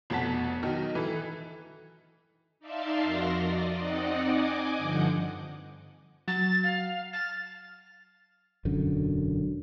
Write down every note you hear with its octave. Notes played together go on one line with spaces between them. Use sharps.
F1 B2 F#5 A5 B6
D#3 F#3
E3 A4
D#4 D5 E5 F5 A5 C6
F2 F#4 A#4 C6 A#6
D5 D#5
C4 D#4 D5 D#5 F#5
D#5 G#5 D6
G2 D3 F3 F#5 G6
F#3 A6
F5
F6 A6
E1 F#2 D3